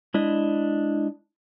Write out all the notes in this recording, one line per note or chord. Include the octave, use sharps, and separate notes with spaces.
G#3 D4 E4 D#5